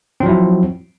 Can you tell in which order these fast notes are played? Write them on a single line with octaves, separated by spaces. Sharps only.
C4 F3 F#3 E4